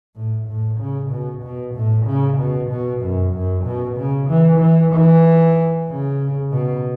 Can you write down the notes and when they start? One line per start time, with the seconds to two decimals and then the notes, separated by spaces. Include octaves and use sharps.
0.16 A2
0.48 A2
0.80 C#3
1.11 B2
1.43 B2
1.75 A2
2.07 C#3
2.38 B2
2.70 B2
3.02 F#2
3.34 F#2
3.65 B2
3.97 C#3
4.29 E3
4.61 E3
4.93 E3
5.88 C#3
6.52 B2